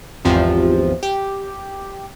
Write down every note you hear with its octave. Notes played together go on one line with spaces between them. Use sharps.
G#1 E2 C3 F3
G4